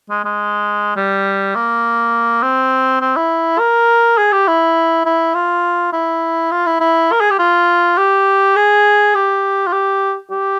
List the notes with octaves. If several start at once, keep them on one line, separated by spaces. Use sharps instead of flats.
G#3
G#3
G3
A#3
C4
C4
E4
A#4
G#4
G4
E4
E4
F4
E4
F4
E4
E4
A#4
G#4
G4
F4
G4
G#4
G4
F4
G4
G4